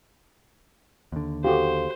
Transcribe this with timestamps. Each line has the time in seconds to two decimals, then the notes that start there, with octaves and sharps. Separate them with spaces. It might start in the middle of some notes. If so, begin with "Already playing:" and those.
1.12 D#2 D3
1.44 F#4 G4 A4 C5 F5